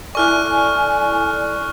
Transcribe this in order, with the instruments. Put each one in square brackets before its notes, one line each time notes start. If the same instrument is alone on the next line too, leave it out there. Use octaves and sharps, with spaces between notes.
[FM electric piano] E4 A4 D5 [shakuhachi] G#5 [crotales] C#6 F6 F#6